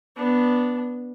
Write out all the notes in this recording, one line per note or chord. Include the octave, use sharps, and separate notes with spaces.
B3 D4